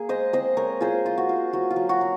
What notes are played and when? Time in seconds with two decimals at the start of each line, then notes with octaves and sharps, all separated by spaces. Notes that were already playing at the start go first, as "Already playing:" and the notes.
Already playing: A#3 G#4
0.09 G#3 C5 D#5
0.33 C4 C5 D#5
0.57 G#3 A#4 C#5
0.81 F4 G#4 C5
1.06 F4
1.18 F#4
1.29 F4
1.53 F#3 F#4
1.70 F4
1.76 F#3
1.89 F#4
2.01 F#3